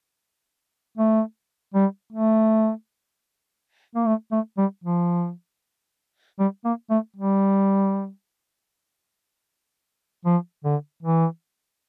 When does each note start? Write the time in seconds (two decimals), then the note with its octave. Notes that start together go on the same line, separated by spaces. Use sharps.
0.98 A3
1.74 G3
2.13 A3
3.95 A#3
4.06 A3
4.32 A3
4.58 G3
4.84 F3
6.39 G3
6.65 A#3
6.90 A3
7.16 G3
10.25 F3
10.64 D3
11.03 E3